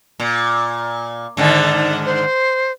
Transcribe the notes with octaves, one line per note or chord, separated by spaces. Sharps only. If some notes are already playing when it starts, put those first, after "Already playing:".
A#2
G#2 D3 D#3 D5
C5